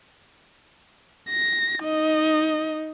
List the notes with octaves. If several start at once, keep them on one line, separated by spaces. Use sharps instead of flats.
A#6
D#4 D#5